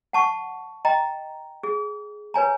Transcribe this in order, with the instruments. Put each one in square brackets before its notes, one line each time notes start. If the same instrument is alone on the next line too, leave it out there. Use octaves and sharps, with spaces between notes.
[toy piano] F#5 A5 C#6
D#5 G5 A#5
G#4
B4 C#5 G#5 A#5